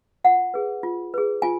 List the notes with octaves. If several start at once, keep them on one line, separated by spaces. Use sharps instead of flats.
F4 F#5
G#4 B4
F4
G#4 B4
F4 G#5